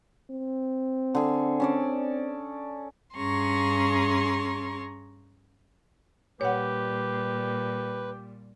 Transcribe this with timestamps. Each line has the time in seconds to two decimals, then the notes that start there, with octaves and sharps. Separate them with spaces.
0.31 C4
1.15 D3 G#4
1.60 C#4 A4 D5
3.15 G2 C#4 G#4 A#5 C6 C#6
6.41 A#2 G3 G4 B4 C#5 F#5